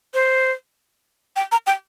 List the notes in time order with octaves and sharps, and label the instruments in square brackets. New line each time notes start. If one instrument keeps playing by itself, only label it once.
[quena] C5
G5
A#5
G5